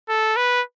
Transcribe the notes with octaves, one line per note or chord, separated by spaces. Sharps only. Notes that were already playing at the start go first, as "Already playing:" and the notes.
A4
B4